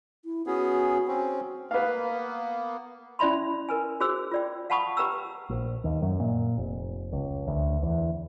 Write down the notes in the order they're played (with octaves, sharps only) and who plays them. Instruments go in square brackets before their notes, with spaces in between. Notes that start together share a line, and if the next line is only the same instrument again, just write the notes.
[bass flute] E4
[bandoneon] B3 C#4 G#4 [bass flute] F#4
[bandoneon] C4 C#4
[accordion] A#3 B3 [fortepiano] B4 F5
[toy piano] C#4 E4 D5 E5 B5 C6
A#4 B4 G#5
F#4 G#4 C5 E6
F4 D5 G5
F5 F#5 A5 B5 C#6 D#6
G4 B4 G5 A#5 E6
[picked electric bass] A#1
D#2
F#2
A#2
F1
C#2
D2
E2